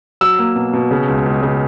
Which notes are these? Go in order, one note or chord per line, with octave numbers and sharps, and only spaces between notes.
F#3 E6
A#3
B2
B2
C#3
C#2
C#2
C#3